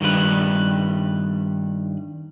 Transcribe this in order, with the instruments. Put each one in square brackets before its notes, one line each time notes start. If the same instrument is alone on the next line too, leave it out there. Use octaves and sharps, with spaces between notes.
[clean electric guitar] G2 D#3 G3 B4